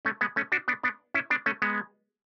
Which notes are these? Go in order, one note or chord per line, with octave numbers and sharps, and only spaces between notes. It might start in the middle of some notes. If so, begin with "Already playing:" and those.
A3 C#4
G#3 B3
A3 C#4
D4 F#4
B3 D4
B3 D4
C#4 E4
B3 D4
A3 C#4
G#3 B3